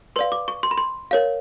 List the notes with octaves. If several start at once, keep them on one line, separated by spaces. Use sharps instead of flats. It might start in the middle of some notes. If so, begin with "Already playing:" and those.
B4 D5 F5 C6
D6
C#6
C6
B5
C6
A#4 C#5 F5